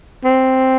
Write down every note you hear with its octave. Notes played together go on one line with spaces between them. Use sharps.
C4